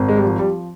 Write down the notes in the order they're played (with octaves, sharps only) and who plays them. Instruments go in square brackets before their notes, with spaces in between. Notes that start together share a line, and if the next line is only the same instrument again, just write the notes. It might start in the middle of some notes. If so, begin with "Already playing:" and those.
Already playing: [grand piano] G#1
[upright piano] G#3
G3
[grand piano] F3
[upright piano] G3